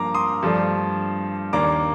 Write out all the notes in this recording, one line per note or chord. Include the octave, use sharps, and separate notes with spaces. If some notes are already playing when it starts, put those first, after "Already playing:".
Already playing: G2 F3 A#3 D4 A#5 D6
C6 D#6
G2 F3 A3 D4
D#2 D#3 A#3 D4 A#5 D6